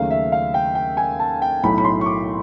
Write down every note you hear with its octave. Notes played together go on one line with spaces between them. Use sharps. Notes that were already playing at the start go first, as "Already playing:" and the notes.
Already playing: D#2 C#3 F#3 A3 F5
E5
F5
G5
G5
G#5
A5
G5
B1 A2 F#3 A3 B5
B5
C6
C#6
D6